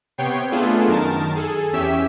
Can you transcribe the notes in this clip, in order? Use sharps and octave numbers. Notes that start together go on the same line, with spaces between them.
C3 B3 C#5 G5 C7
A3 B3 D4 F4 G#4 A4
F#2 D#3 A#4 A5
G#4 A4
E2 C#4 G4 E5 E6 B6